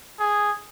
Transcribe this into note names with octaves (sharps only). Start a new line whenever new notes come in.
G#4